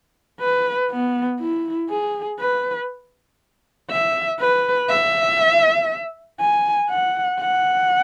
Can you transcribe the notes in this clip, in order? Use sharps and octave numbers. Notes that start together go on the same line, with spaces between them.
B4
B3
E4
G#4
B4
E5
B4
E5
G#5
F#5
F#5